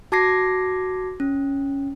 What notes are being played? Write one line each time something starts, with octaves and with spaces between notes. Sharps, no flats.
F#4 A5 D6 G#6 A#6 C7
C#4